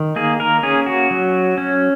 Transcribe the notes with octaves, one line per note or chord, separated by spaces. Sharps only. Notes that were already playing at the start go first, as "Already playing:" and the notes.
Already playing: D#3
A#3 G#4
A#4
C#4 G#4
F#4
F#3
C#4